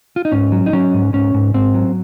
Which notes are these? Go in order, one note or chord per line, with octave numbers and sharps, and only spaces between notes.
F4
D#4
G#2 C#4
F#3
D#4
F#3 C#4
G#2
G#2 C#4
G#2
G#2 C4
F#3